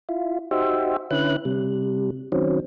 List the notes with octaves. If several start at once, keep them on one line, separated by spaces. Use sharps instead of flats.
E4 F4
D#4 F#4 G4 C5 E5
D3 C#4 E4 B4 F#6
C3 G3
D#3 F#3 C4 C#4